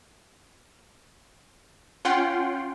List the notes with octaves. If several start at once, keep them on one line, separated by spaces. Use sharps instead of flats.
C#4 F4 F#5 G5 C6